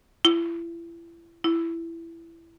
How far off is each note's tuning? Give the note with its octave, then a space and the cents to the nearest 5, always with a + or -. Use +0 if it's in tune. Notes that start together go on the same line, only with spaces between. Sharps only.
E4 +35
E4 +15